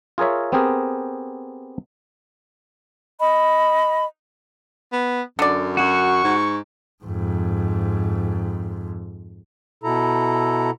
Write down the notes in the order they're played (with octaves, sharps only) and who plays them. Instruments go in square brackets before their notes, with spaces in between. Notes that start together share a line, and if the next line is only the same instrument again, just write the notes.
[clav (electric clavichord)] F4 G#4 A#4 C#5 E5
B3 C4 G4 G#4 A#4
[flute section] D#5 B5
[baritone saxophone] B3
[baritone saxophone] F#2 [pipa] D3 D5
[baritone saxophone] F#2 [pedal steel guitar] F#4 [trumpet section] C#6
[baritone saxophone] G#2
[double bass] F2 G#2
[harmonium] B2 E4 A4 A#5